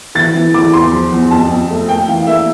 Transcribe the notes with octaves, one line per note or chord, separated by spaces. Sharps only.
E3 A6
E3
E3 D6
E2 C6
F3
E2
F2 A5
F2
A3
A#3 G5
E3 F5
A#3 E5